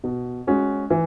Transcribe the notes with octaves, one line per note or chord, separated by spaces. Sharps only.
B2
G#3 C#4 F#4
E3